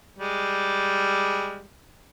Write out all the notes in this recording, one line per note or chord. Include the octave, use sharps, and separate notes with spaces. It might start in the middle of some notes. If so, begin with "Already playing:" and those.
G3 G#3